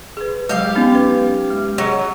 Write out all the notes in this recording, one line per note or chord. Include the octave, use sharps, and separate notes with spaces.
G#4 B4
F#3 G#3 G4 F5
B3 C#4 D#4
B4
G#3
F#3 G#4 C#5 D#5